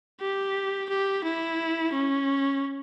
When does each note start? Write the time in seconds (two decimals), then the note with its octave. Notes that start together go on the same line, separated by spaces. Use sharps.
0.21 G4
0.89 G4
1.24 E4
1.93 C#4